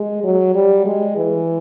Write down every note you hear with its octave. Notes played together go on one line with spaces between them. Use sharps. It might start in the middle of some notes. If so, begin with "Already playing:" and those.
Already playing: G#3
F#3
G3
G#3
E3